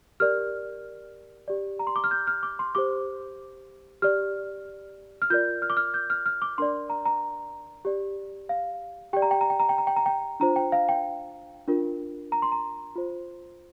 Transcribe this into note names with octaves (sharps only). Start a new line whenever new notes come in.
G4 A#4 D5 F6
G4 D5
A#5
C6
D6
F6
G6
F6
D6
C6
G4 C5 D6
G4 D5 F6
F6
F4 A#4 D5 G6
F6
D6
F6
G6
F6
F6
D6
D4 A#4 D5 C6
A#5
A#5
G4 D5
F5
G4 D5 G5
A#5
G5
A#5
G5
A#5
G5
A#5
G5
A#5
G5
D4 F4 C5 A#5
G5
F5
G5
D4 F4 A#4
A#5
C6
A#5
F4 C5